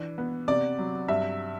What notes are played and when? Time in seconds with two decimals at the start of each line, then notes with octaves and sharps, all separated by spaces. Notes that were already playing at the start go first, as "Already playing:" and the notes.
Already playing: E3 D4
0.18 B3
0.48 C3 D5
0.79 F#3
1.08 G2 E5